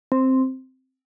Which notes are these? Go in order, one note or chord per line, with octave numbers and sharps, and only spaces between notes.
C4